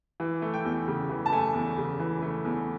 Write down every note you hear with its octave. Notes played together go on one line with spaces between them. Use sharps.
E3
A3
G5
E2
C#3
E3
A5
A3 G#5
E2
C#3
E3
A3
E2